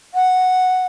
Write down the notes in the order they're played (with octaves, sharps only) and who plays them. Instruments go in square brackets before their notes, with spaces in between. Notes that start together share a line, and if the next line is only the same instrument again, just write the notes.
[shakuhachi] F#5